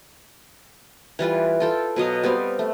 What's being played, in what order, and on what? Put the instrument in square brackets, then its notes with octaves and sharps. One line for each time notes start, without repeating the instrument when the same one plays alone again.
[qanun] E3 G3 F4 B4
F4 A4 G5
B2 F#3 D#5 F5
G3 B3 C4 F5
A3